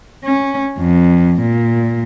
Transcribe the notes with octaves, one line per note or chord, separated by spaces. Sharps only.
C#4
F2
A#2